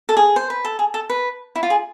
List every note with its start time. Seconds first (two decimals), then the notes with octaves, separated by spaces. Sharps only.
0.09 A4
0.17 G#4
0.36 C5
0.50 B4
0.65 A4
0.79 G#4
0.94 A4
1.10 B4
1.56 E4
1.63 F4
1.70 G#4